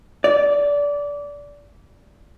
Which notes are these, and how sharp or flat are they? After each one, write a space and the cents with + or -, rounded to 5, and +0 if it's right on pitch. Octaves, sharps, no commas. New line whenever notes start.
D5 -20